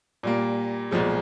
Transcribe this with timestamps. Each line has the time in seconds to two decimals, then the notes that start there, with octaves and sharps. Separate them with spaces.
0.23 A#2 G3 A#3
0.91 B1 A#2 F3 G#3